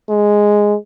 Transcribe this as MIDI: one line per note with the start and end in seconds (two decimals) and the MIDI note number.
0.10 0.76 56